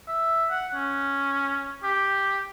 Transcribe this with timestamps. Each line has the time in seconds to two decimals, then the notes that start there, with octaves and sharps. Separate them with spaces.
0.08 E5
0.50 F#5
0.75 C#4
1.83 G4